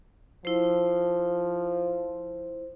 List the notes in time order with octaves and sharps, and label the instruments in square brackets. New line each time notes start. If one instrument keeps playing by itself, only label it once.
[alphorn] F3 [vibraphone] E4 C5